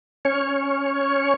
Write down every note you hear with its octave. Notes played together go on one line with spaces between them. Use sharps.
C#4 C#5